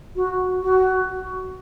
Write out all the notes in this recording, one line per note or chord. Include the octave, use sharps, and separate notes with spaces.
F#4
F#4